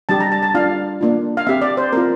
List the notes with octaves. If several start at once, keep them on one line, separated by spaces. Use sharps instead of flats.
G3 D4 G4 A5
A#5
A5
A5
G3 D4 F4 F5
A#3 D4 F4
F5
C4 G4 E5
D5
C5
C4 F4 A#4